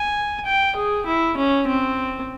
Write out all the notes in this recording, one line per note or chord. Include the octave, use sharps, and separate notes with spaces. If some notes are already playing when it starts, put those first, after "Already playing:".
Already playing: G#5
G5
G#4
E4
C#4
C4